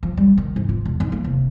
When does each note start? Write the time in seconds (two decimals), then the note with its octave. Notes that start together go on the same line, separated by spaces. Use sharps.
0.03 F3
0.17 G3
0.38 D#3
0.56 G#2
0.69 F4
0.85 E1
1.00 D#4
1.12 A#3
1.24 F1